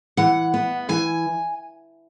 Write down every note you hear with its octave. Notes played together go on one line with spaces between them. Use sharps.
E3 F#5
B3
E3 G#5